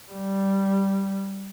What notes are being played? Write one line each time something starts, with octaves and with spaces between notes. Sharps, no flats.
G3